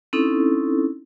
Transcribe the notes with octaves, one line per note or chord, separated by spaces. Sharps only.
C4 C#4 D#4 E4 A4